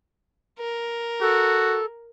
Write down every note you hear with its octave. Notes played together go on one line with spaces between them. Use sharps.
A#4
F#4 A4